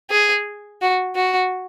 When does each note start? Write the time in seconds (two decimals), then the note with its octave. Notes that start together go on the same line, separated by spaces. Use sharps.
0.10 G#4
0.82 F#4
1.16 F#4